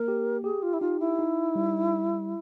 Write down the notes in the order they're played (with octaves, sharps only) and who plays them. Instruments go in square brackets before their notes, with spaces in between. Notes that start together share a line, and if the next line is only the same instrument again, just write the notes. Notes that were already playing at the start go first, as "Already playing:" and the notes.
Already playing: [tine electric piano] A#3 [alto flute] A#4
[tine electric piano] G4
[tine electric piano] G4 [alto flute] G#4
[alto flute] F4
E4
[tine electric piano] D#4 [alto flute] F4
[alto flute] E4
[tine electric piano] D#4
G3